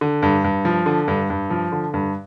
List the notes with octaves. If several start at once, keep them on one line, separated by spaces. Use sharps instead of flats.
D3
G2
G2
F3
D3
G2
G2
F3
D3
G2